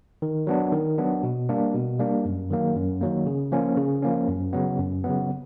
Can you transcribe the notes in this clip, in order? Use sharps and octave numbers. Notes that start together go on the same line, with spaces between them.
D#3
F#3 B3 D4
D#3
F#3 B3 D4
B2
G3 A#3 D4
B2
G3 A#3 D4
F#2
D#3 F#3 A#3
F#2
D#3 F#3 A#3
C#3
F3 A#3 C#4
C#3
F3 A#3 C#4
F#2
C#3 F#3 B3
F#2
C#3 F#3 B3